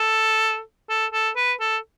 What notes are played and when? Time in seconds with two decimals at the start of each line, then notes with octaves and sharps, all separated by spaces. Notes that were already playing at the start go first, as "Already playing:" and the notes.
Already playing: A4
0.89 A4
1.13 A4
1.36 B4
1.60 A4